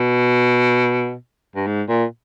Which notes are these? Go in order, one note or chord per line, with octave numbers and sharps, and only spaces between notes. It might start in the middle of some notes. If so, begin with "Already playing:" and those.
Already playing: B2
G2
G#2
A#2